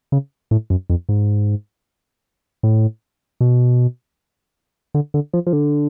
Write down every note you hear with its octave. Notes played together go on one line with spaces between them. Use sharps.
C#3
A2
F#2
F2
G#2
A2
B2
D3
D3
F3
F3
D3